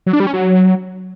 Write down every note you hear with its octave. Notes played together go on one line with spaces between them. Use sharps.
F#3
D4
G3
C#4
F#3